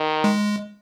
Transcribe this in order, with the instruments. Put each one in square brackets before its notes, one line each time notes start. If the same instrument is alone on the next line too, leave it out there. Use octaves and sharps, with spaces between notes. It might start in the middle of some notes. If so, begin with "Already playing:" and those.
Already playing: [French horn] D#3
[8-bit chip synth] G#3